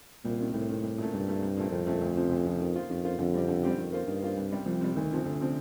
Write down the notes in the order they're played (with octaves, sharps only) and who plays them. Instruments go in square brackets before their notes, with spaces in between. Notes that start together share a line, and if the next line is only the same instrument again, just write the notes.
[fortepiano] C2 [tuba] A#2
[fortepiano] C3 D#3
[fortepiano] C2 [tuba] A2
[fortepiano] C3 D#3
C2
A#2 A3
[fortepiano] C2 [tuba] G2
[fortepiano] A#2 A3
C2
A#2 A3 C4
[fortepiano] C2 [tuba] F2
[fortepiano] A#2 A3 C4
D2
C3 F3
D2
C3 F3
D#3
A#3 F4 C5
[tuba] F2 [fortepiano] D#3
[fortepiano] A#3 F4 C5
[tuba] F2 [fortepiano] D3
[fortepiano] G3 C4 G4
D3
G3 C4 G4
[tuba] F2 [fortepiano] D#3
[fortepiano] A#3 F4 C5
[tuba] G2 [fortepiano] D#3
[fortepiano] A#3 F4 C5
C2
C3 G3
[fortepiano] C2 [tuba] F3
[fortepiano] C3 G3
[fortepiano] D2 [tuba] D#3
[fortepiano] C3 F3 C4
[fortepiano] D2 [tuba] D3
[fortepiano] C3 F3 C4